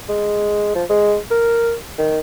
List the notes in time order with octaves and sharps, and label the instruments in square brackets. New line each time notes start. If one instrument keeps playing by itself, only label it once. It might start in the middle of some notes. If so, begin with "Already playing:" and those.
[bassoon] G#3
F3
G#3
A#4
D#3